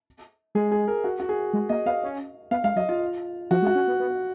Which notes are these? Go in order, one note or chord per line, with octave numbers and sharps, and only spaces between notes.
G#3 G#4
G#4
A#4
F#4
F#4
G#4
G#3
A#3 D#5
B3 F5
C#4
B3 F5
G#3 F5
F#3 D#5
F4
F3 F#4
G#3
F#4
C#4
B3
B3